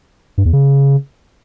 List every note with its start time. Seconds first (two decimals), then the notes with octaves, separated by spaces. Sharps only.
0.38 G2
0.45 E2
0.53 C#3